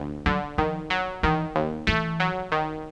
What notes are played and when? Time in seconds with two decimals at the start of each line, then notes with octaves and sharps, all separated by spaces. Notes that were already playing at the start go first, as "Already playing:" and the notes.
Already playing: D2
0.26 D3 F#3
0.58 D#3 F3
0.90 F#3
1.23 D#3 E3
1.55 D#2
1.87 E3 A3
2.20 F#3
2.52 D#3